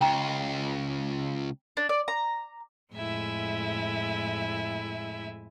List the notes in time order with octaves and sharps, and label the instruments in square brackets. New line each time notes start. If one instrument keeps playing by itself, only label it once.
[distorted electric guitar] C#2 [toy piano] G5 A#5
[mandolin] D4
D5
A#5
[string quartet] F2 A2 G#3 E4 E5 G#5